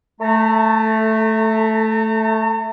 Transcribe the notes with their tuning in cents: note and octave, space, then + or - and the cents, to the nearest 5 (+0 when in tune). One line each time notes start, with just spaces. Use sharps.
A3 +0 A#5 -45